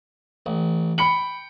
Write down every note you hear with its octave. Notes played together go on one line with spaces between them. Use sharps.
A1
G5 B5 C#7 F#7